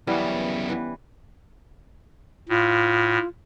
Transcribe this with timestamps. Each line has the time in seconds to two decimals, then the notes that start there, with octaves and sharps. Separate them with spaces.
0.07 F#2 E3 G3 B3 C#4 E4
0.69 E3 B4
2.49 A2 F4